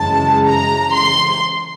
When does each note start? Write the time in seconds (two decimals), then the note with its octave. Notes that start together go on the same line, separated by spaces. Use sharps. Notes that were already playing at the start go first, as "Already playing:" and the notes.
Already playing: F#2 C#3 E3 G#3 A5
0.47 A#5
0.94 C6